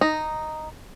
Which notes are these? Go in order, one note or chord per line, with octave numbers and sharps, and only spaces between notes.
D#4